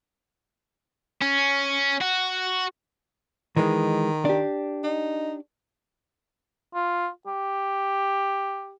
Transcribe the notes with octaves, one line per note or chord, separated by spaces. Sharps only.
C#4
F#4
D#3 E3 G#3
D4 G4
D#4
F4
G4